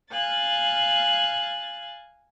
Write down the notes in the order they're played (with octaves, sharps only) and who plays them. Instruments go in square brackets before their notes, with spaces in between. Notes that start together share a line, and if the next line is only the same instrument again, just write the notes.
[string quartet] F5 G#5 F#6 A6